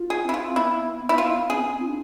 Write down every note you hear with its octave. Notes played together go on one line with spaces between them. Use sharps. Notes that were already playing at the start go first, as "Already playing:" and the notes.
Already playing: F4
G#4
C4 E4
F4
B3 E4
E4
F4
D4 G#4
C4
F4
D4